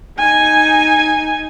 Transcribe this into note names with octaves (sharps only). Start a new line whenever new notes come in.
D#4 G#5